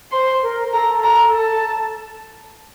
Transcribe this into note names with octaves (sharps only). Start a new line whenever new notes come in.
C5 C6
A#4
A4 A#5
A#5
A5